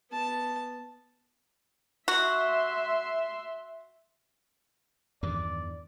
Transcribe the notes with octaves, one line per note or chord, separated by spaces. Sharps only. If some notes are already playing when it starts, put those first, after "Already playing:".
B3 A5
F#4 E5 C6
E2 G2 D#3 D5